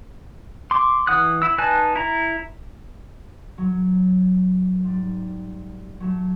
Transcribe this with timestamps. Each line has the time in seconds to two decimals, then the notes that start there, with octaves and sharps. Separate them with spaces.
0.71 C6 D6
1.07 E3 F#5 D#6 F#6
1.42 E4 E6
1.58 D#4 B4 G#5 A5 F#6
1.96 E4 A#5
3.58 F#3
4.84 G#2 G3
6.00 F#3 A3